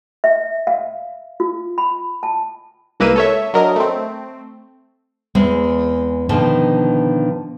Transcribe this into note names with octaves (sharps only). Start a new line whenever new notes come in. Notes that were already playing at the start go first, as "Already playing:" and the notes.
E5
F5
F4
B5
A5
C2 G#3 A#3 B4 E6 D#7
A4 C#5 E5
F#3 D4 A#4 D#5
A3 C4
E2 G#3 C4 G#4
B2 D3 D#3 F3 D#4